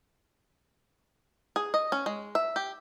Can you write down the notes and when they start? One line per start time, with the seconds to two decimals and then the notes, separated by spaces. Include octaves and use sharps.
1.56 G#4
1.74 D#5
1.92 C#4
2.06 G#3
2.35 E5
2.56 G4